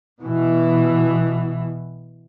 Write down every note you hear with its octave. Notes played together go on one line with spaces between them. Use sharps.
B2 E3